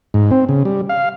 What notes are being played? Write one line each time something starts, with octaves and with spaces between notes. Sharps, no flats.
G#2
C4
C#3
G3
F5